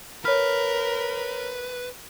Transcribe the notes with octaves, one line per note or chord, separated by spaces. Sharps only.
A#4 B4 C#5 F6